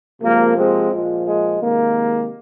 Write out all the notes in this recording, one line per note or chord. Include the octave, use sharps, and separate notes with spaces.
C3 F3 G#3 A#3
G#3 C4
A#2 F3 G#3
G#3
C3 D#3 G#3 A#3